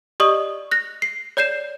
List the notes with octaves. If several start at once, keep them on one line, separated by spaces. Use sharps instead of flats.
G4 D5 D#5 C#6 D#6 F#7
F#6 A#6
C7
C#5 D5 G6 C7 E7